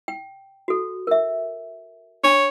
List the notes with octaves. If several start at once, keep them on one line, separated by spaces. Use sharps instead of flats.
G5
F#4 A4
A#4 E5
D4 C#5